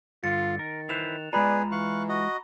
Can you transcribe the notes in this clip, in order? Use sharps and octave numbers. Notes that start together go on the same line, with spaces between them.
G2 D3 F4 A6 C#7
D#3 A#4
E4 B4 C5 F#6 E7 F7
G#3 B3 F4 G#4 B4 D5 A#5 B5
E3 F5 C#6 F#6
F#4 D#5